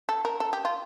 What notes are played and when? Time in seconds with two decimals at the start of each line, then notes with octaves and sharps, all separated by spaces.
0.09 A4
0.25 A#4
0.40 A4
0.53 G4
0.65 F4